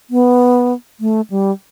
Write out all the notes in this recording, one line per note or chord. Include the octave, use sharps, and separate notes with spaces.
B3
A3
G3